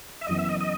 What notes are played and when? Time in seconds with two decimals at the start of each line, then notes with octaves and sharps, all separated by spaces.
0.21 E5
0.27 F#1 F#2 E3 B3 D#5
0.39 E5
0.49 D#5
0.61 D#5